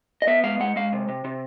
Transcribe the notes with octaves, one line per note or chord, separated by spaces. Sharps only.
D#5
B3 E5
G#3 F5
G#3 F#5
G#3 F5
C3
C3
C3